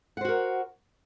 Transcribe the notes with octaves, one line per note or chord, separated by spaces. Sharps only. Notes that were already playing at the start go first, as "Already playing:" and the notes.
F#4 A#4 C5 F#5